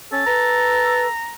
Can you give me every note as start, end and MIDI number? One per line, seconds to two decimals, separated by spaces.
0.13 0.23 61
0.13 1.09 69
0.26 1.07 71
0.26 1.32 82